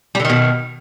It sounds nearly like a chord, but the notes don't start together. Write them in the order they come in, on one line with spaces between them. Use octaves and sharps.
G3 D3 D#3 B2